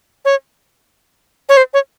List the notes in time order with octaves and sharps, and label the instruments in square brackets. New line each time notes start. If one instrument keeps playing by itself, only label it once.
[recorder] C#5
C#5
C5
C#5